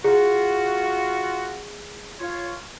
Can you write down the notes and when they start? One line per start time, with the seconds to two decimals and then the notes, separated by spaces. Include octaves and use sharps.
0.04 F4 F#4 G#4
2.19 F4 C#5